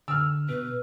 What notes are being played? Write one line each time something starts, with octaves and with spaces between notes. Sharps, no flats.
D3 E6 F6
B2 B4